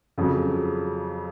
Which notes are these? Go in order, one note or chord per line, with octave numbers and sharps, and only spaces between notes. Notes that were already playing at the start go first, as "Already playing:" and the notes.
F2 C#3 F#3